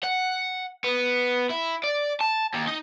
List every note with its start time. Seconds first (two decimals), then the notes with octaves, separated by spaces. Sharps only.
0.03 F#5
0.84 B3
1.51 E4
1.84 D5
2.21 A5
2.54 D#2
2.68 D#4